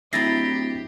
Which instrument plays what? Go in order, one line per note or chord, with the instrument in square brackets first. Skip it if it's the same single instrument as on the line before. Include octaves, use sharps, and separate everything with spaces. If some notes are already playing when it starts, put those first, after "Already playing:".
[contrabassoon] D1 [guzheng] E4 D#5 A#5 [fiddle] G4 [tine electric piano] A6 A#6 C7